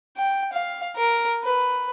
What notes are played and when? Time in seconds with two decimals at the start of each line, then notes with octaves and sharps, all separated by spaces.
0.17 G5
0.53 F5
0.96 A#4
1.43 B4